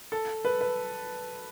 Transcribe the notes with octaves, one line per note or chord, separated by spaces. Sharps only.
A4
B4
B4